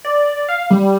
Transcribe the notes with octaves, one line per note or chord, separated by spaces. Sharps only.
D5
F5
G3